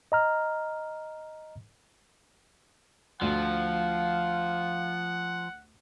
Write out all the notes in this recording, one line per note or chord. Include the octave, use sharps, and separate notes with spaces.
D#5 A#5 F6
D2 F3 F5 F#5